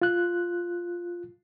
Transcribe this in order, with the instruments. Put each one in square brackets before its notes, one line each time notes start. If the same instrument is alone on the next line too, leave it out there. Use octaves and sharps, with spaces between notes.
[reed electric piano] F4 F#6